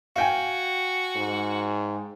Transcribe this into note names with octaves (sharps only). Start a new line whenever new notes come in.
F#4 F5 G5 G#5
G#2